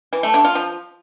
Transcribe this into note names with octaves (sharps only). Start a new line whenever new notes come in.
E3
A3
D3
F4
F3